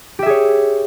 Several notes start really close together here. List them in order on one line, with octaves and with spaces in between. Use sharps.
G4 E5 G#4 C#5